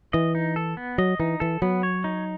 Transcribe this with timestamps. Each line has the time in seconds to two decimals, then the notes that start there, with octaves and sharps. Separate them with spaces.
0.13 E3 D#5
0.35 D#4
0.56 A4
0.77 B3
0.98 F#3 D#5
1.19 E3 D#4
1.40 E3 A4
1.62 F#3 B3
1.83 C#5
2.04 D#4